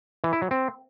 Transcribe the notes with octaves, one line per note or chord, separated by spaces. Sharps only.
E3
E4
F#3
C4